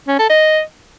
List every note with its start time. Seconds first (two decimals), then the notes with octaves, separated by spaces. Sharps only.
0.08 C#4
0.19 A4
0.30 D#5